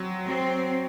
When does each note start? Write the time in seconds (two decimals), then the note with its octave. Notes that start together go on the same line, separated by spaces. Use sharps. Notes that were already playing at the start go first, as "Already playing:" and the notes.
Already playing: F#3 C4
0.28 F#3 C4